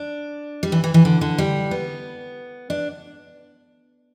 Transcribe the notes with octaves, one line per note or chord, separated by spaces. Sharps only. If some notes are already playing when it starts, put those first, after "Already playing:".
Already playing: D4
G3
E3
E3
E3
D3
D3
G3
B3
D4